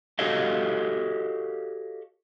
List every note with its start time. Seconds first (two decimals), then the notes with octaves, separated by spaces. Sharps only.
0.19 F#4 G4 A4 C#5 D#5 F5